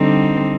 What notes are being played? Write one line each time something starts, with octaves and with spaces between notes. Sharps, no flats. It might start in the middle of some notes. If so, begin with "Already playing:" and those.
Already playing: D3 G3 C4 D#4